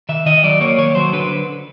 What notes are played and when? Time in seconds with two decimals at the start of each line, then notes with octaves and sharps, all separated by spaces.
0.09 D#3 E5
0.26 D#3 D#5
0.43 F#3 D5
0.61 A#3 C#5
0.78 D#3 C#5
0.95 F#3 C5
1.13 D3 B4